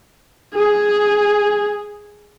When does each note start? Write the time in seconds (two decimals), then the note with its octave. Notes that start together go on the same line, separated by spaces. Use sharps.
0.55 G#4